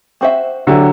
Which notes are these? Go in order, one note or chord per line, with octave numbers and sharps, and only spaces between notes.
C4 F#4 C5 E5
D3 F#3 C4 E4 B4 E5